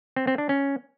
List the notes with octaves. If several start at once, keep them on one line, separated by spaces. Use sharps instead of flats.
C4
C4
D4
C#4